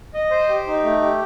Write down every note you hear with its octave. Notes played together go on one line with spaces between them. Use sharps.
D#5
C5
G4
D#4
A3
G4